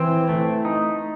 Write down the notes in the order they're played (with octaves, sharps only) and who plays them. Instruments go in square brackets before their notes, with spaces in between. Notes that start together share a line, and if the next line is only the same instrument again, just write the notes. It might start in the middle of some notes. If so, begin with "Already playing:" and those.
Already playing: [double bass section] E3 [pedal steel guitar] C4
[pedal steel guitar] A3
D#4